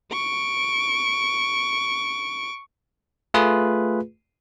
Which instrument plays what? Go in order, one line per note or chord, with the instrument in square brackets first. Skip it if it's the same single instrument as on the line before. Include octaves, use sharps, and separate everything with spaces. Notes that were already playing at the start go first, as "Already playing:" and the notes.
[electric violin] C#6 D7
[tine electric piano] A3 F4 G#4 B4